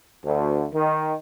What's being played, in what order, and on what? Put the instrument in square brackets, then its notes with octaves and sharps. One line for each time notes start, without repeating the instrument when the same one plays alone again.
[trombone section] D2
D#3